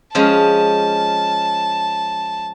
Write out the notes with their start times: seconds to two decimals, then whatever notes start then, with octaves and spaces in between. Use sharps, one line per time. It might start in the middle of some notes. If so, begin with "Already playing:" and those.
0.15 F3 G#3 C#4 A5